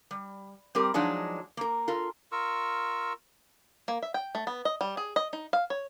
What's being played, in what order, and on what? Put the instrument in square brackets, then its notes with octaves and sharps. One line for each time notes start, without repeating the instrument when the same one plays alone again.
[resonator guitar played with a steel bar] G3
G3 C4 G4 A#4
F3 F#3 G#3 D4 D#4
A#3 A#4
F4 A4 A#4
[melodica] F4 A#4 C#6 E6
[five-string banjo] A#3
E5
G5
A3
B3
D#5
G3
G#4
D#5
D#4
F5
C#5